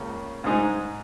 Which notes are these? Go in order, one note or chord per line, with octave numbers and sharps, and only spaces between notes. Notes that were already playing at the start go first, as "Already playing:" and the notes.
Already playing: C#2 C#3 A#3
G#2 G#3 D#4 G#4